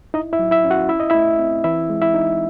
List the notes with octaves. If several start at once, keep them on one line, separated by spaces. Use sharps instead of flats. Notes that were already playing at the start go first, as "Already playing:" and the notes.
D#4 E4 D#5
E4 E5
F#3
E4 E5
C#4
F#4 F#5
E4 E5
D#5
A3 E4 E5
C4
E3 E4 E5
G#3
E4 E5
D#4